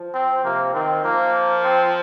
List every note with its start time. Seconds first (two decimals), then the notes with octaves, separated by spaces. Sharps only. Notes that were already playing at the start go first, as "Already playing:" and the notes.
Already playing: F3
0.14 C4
0.44 C3 A#3
0.74 D#3 C4
1.04 F3 A#3
1.64 C4